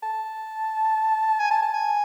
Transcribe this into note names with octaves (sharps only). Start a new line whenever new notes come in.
A5
G#5
A5
A5
G#5